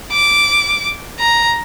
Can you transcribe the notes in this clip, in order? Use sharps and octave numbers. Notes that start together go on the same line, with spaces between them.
D6
A#5